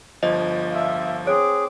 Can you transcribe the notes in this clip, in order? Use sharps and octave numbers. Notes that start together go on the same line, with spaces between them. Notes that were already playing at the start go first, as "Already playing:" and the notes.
G1 F3 D#5
E5 F5
C4 G#4 C#5 D6